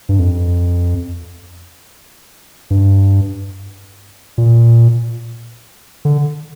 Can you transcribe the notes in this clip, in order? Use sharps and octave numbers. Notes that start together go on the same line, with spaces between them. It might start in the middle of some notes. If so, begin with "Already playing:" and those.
G2
F2
G2
A#2
D3